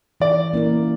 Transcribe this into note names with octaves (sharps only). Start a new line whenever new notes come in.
E3 D5
A#3 C#4 E4 A#4